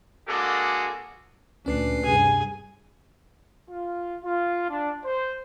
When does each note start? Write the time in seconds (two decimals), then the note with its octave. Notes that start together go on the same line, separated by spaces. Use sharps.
0.28 G#3 A#3 D4 F#4 G#4 A4
1.66 D2 A#2 C#4 D4 B4 C7
2.04 G2 C3 G#4 G#5
3.70 F4
4.25 F4
4.69 D4
5.03 C5